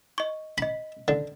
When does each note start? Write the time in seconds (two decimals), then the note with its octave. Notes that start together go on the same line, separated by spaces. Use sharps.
0.18 D#5 C#6
0.58 D#5 B5 B6
1.08 D3